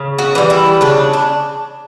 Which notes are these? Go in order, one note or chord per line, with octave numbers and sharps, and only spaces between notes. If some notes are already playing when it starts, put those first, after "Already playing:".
Already playing: C#3
F#4
E3 G3
E4
C#3 D4
D4